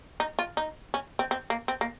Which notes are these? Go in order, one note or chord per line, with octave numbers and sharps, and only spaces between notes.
D#4
F4
D#4
C#4
C4
C4
A#3
C4
A#3